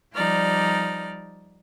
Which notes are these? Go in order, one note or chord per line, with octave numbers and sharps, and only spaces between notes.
F3 G3 D#4 D5 F6